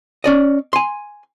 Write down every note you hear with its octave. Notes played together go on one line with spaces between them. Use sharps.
C#4 D5 D#5
G#5 C6